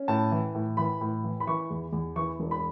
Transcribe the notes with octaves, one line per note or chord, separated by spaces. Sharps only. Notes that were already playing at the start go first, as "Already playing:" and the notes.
Already playing: C#4
A2 A5
E3
A2
E3 B5
A2
E3
B5
E3 C#6
E2
E2
E3 C#6
E1
B5